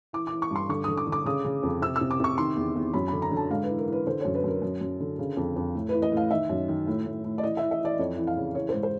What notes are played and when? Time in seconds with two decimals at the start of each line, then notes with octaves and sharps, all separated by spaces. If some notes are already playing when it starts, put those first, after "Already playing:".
0.13 E3 D6
0.27 D6
0.32 E3
0.42 C#6
0.51 G2 C6
0.69 D3 C#6
0.84 D3 D#6
0.97 D6
1.07 D3
1.12 D6
1.26 C#3 D#6
1.45 C#3
1.63 F2
1.82 C3 E6
1.96 E6
2.01 C3
2.11 D6
2.20 C3 C#6
2.38 D#3 C6
2.57 E2
2.76 E2
2.94 F#2 B5
3.08 D3 B5
3.22 A#5
3.31 D3
3.37 A5
3.50 G#2 F5
3.64 B4
3.69 E3
3.78 A#4
3.87 E3
3.92 B4
4.07 D3 C5
4.21 F#2 C#5
4.35 B4
4.44 F#2 A#4
4.62 F#2
4.81 F#2
5.00 D3
5.19 C#3
5.37 F2
5.56 F2
5.75 A2
5.89 B4
5.94 E3
6.02 D#5
6.12 A2 F5
6.31 D#3 E5
6.50 F#2
6.69 D#3
6.87 A2
7.06 A2
7.24 A2
7.38 D5
7.43 E3 D#5
7.57 E3 E5
7.71 E5
7.81 E3 D5
7.99 F2 C#5
8.17 E3
8.27 F5
8.37 C#3
8.55 E3 C#5
8.69 G#2 C5
8.83 C5